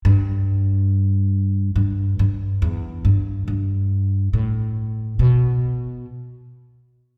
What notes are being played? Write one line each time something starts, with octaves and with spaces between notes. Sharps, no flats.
G2
G2
G2
E2
G2
G2
A2
B2